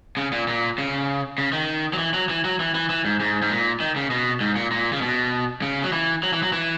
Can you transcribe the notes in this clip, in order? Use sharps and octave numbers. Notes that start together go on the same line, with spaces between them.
C#3
A#2
A#2
C#3
C#3
D#3
F#3
E3
F#3
E3
F#3
E3
E3
E3
G#2
G#2
G#2
A#2
D#3
C#3
B2
G#2
A#2
A#2
C#3
B2
C#3
F#3
E3
F#3
E3
F#3
E3